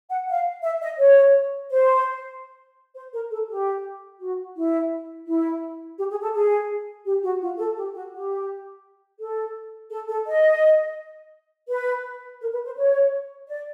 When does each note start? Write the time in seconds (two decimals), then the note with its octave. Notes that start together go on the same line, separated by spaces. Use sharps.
0.09 F#5
0.28 F5
0.63 E5
0.81 D#5
0.99 C#5
1.70 C5
2.95 C5
3.13 A#4
3.31 A4
3.49 G4
4.20 F#4
4.56 E4
5.27 E4
5.98 G4
6.10 G#4
6.22 A4
6.34 G#4
7.06 G4
7.23 F#4
7.41 F4
7.58 A4
7.77 G4
7.94 F#4
8.12 G4
9.19 A4
9.91 A4
10.09 A4
10.26 D#5
11.69 B4
12.41 A#4
12.52 B4
12.65 C5
12.76 C#5
13.47 D5